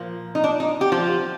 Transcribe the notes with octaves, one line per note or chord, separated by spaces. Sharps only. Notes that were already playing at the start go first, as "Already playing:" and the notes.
Already playing: A#2 F3 A#3
D#4
D4
D#4
G4
F3 F4